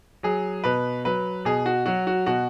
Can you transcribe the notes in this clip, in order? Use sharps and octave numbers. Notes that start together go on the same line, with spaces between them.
F#3 G#4
B2 B4
F#3 B4
B2 G#4
F#4
F#3 F#4
F#4
B2 F#4